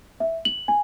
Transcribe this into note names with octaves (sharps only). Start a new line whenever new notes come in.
E5
F#7
G#5